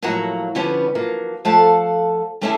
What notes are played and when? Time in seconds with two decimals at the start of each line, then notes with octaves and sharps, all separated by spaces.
0.02 A2 F3 F#3 A#3 F#5 A#5
0.55 D3 F3 G3 B3 C#4 B4
0.95 F3 F#3 A#3
1.45 F3 A3 A4 F5 F#5 A5
2.41 G3 A3 C#4 E4 G#4 A4